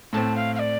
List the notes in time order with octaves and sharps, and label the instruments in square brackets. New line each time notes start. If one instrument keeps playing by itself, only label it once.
[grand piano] A2 A3 C4 [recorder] A5
[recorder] F5
F5
D5